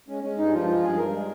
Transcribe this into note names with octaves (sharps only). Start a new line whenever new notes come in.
G#3 C#4
G#3 C#4
G2 D#4
F3 F4
G#3
G2 G#4
G2 A#4
G#3